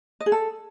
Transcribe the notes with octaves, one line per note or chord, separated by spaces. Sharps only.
D#5
G#4
A4